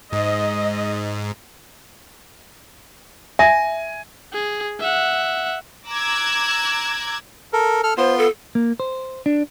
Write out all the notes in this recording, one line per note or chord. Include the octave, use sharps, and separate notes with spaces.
G#2 D#5
E5 G#5
G#4
E5 F#5
A#5 D6 E6 F#6 G#6
A4 A#4
A4 F6
B3 F4 C5 C6
A4
A#3
C5
D4